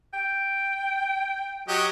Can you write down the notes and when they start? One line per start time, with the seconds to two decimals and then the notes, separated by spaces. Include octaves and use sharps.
0.14 G5
1.68 F#3 G4 D#5